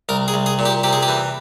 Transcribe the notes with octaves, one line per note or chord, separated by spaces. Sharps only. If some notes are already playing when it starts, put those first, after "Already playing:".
C2 A#4
G#4
C2
G#4
A#2
G4
C3 G4
G#4
G4
E3